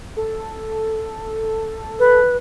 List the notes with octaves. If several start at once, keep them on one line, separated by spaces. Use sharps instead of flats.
A4
B4